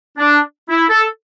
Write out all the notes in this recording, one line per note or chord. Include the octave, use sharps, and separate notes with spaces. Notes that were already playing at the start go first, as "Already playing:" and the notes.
D4
E4
A4